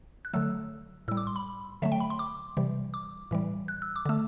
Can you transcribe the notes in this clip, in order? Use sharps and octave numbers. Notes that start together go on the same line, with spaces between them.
F#6
D3 F#3 A3 E6
A2 G3 E6
D6
C6
B5
D3 F#3 A3 E5
G5
B5
C6
D6
C3 E3 G3
D6
A2 E3 G3
F#6
E6
D6
D3 A3 E6